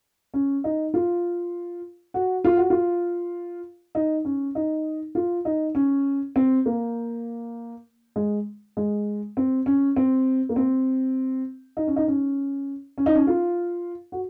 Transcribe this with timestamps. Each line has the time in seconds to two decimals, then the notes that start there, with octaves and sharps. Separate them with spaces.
0.34 C#4
0.64 D#4
0.94 F4
2.14 F#4
2.44 F4
2.57 F#4
2.70 F4
3.95 D#4
4.25 C#4
4.55 D#4
5.15 F4
5.45 D#4
5.75 C#4
6.36 C4
6.66 A#3
8.16 G#3
8.77 G#3
9.37 C4
9.66 C#4
9.96 C4
10.49 A#3
10.56 C4
11.77 D#4
11.87 C#4
11.96 D#4
12.08 C#4
12.98 C#4
13.06 D#4
13.15 C#4
13.27 F4
14.12 F#4